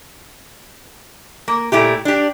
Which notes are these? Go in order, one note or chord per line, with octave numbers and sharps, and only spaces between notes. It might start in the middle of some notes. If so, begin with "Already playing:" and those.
A#3
A#2 A3 E4 G4
D4 G4